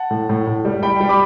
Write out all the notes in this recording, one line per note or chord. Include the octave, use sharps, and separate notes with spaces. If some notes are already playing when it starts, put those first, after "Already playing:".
Already playing: F#5 A5
A2
A2
A2
G3
G3 G5 B5
G3
B5 D6